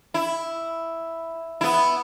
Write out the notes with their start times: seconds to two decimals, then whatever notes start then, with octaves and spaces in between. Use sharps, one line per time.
0.14 E4
1.61 B3 E4